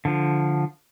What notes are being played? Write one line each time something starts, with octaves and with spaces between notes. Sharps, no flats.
D3 F3